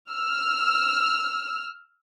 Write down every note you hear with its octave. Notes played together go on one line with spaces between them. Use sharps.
E6 F6